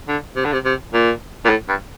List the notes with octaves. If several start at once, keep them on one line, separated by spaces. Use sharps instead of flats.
D3
C3
D3
C3
C3
A#2
A#2
A2
G2